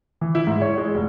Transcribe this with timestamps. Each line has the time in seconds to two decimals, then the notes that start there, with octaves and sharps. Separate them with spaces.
0.21 E3
0.35 E4
0.47 G#2
0.61 C#5
0.78 G#3
0.94 F1